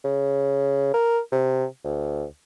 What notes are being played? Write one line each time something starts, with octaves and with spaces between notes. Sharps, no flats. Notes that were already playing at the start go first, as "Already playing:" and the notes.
C#3
A#4
C3
D2